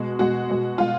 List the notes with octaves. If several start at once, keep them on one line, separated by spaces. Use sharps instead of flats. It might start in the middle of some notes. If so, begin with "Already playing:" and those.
Already playing: B2 G#3 F#4
B2 G#3 F#4
B2 G#3
B2 G#3 F4